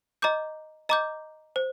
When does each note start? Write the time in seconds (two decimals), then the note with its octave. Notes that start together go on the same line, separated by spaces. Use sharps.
0.22 D#5 A#5 D6 G6
0.89 D#5 A#5 D6 G6
1.56 C5